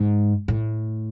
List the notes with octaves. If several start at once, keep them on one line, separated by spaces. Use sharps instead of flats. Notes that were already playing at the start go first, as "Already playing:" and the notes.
Already playing: G#2
A2